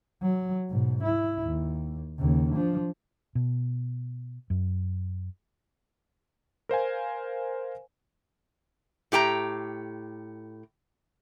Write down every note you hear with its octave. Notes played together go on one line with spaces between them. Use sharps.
F#3
G#2 B2
E4
D#2
D#2 C#3
F3 D4
B2
F#2
A#4 C5 F5 G#5
A2 G4 G5 A#5